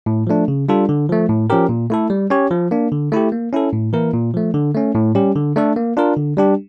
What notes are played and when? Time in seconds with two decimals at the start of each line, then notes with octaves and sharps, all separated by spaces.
0.06 A2
0.27 F3 A3 D4
0.48 C#3
0.69 G3 D4 F4 A4
0.89 D3
1.09 F3 A3
1.29 A2
1.50 F3 C#4 G4 A#4
1.69 A#2
1.90 A3 E4 A4
2.10 G3
2.30 C#4 G4 C#5
2.51 F3
2.71 A#3 D4
2.92 D3
3.12 A3 E4 G4
3.32 A#3
3.53 C#4 E4 A4
3.73 A2
3.93 E3 A#3 E4 A#4
4.13 A#2
4.34 F3 A3
4.54 D3
4.75 A3 C#4
4.95 A2
5.15 G3 C#4 G4
5.36 D3
5.56 A3 D4 A4
5.76 A#3
5.97 D4 F4 A#4
6.16 D3
6.37 G3 D4 G4